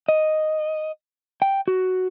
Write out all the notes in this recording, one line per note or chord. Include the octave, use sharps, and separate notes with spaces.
D#5
G5
F#4